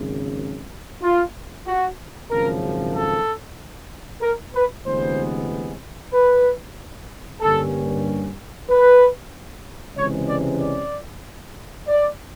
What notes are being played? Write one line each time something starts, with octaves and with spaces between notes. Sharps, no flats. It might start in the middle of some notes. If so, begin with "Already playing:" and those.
Already playing: G#1 F#2 C#3
F4
F#4
G#1 F#2 C#3 F3 A#4
A4
A#4
B4
D2 C3 E3 G#3 B3 C5
B4
G2 D3 G3 A#3 C#4 A4
B4
C#2 C3 E3 G#3 C#4 C#5
D5
D5
D5